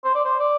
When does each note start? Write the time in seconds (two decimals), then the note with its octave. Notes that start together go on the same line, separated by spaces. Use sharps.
0.04 C5
0.14 D5
0.24 C5
0.39 D5